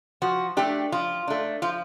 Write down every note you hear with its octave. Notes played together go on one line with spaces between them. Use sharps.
F3 F#4
A3 D4 G4
F3 F4
A3 D4
F3 F4